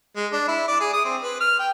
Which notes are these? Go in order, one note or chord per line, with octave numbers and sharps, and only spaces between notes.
G#3
D4
E4
D5
G#4
D#6
C4
B4
F6
G5